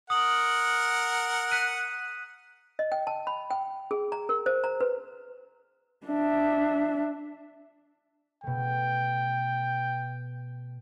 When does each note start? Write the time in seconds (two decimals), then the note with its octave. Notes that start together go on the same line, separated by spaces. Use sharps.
0.10 A#4 F#5 D#6 F#7
1.52 F#6 B6 D#7
2.79 D#5
2.92 G5
3.07 A5
3.27 B5
3.50 G5
3.91 G#4
4.12 A#5
4.29 A#4
4.46 C5
4.64 A#5
4.81 B4
6.07 D4 E5
8.43 B2 A3 G5